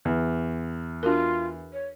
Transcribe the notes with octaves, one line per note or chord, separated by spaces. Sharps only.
E2
D4 F4 F#4 A#4
C#5